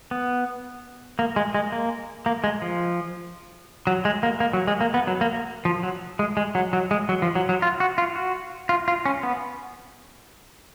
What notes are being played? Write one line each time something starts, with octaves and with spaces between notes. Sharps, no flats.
B3
A#3
G#3
G#3
A#3
A#3
G#3
F3
F#3
G#3
A#3
A#3
F#3
G#3
A#3
B3
F#3
A#3
A#3
F3
F#3
G#3
G#3
F#3
F#3
G#3
F#3
F3
F#3
F#3
F4
F#4
F4
F#4
F4
F4
C#4
B3